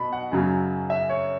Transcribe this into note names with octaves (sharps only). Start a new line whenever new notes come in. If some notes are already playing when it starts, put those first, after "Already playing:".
Already playing: B2 B5
F#5
F#2 C#3 F#3
E5
C#5